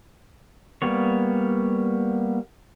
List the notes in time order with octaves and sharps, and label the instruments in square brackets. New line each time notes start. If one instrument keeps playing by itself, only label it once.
[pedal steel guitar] G3 A#3 B3 C#5